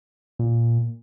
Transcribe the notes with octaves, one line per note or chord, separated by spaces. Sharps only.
A#2